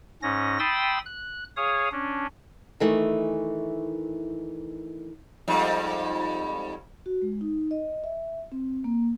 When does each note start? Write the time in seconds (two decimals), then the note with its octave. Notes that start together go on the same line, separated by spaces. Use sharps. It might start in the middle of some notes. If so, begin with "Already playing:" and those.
0.22 G#2 C#4 A#6
0.59 G5 B5 C6 D#6 E6 A6
1.06 F#6
1.57 G#4 C#5 F5 D#6
1.92 C#4 D4
2.80 D#3 E3 A3
5.48 F2 G#2 G3
7.06 F#4
7.22 G#3
7.41 D#4
7.71 D#5
8.04 E5
8.52 C4
8.84 A#3